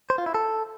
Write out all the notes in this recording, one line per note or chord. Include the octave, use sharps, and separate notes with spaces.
C5
F4
E4
A4